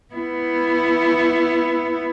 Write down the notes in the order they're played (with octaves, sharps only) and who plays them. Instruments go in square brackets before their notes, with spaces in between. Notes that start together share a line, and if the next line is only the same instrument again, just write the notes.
[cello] B3 E4